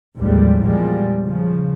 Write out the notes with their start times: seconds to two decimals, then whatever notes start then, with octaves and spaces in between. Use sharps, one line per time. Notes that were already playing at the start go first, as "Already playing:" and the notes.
0.18 A1 D#2 G#2 F3 G3
0.61 E2 A#2 F3 G3 G#3
1.22 C#3 F3